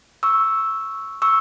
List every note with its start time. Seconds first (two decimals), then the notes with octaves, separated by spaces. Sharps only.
0.23 C#6 E6
1.22 C#6 E6